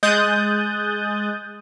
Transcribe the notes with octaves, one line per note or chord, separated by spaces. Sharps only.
G#3 D#6 F#6 G6 A6